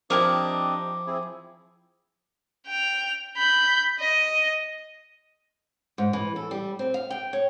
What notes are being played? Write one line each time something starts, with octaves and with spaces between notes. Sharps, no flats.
F3 C4 D4 E4 G4 A#4 D#5 D6
C4 E4 G#4
G5 F7
B5 G6
D#5
G#2
E3
A4
G3
C4
F5
G5
C#5